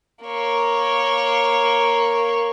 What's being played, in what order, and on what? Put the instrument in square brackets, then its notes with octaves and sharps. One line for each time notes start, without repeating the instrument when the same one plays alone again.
[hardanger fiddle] A#3 C#5